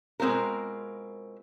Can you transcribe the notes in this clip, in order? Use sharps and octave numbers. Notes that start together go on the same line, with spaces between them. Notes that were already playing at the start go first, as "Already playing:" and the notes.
B2 G#3 C4 F4 A#4